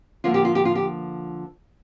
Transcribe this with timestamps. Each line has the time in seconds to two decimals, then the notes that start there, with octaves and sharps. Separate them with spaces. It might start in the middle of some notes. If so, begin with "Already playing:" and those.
0.24 D3 F3 A#3 F4
0.34 G4
0.45 F4
0.55 G4
0.65 F4
0.75 G4